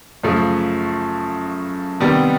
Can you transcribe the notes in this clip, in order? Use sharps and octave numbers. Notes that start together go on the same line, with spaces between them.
F#2 C#3 F3 A3
C3 D#3 G3 B3